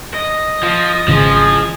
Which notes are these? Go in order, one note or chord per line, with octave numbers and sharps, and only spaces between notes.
D#5
F3
G#1 C#3 E3 F3 G#4